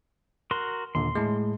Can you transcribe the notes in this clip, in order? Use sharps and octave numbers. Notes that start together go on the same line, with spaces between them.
F#4 A#4 C6
D#2 A#2 D3 C6
A2 G#3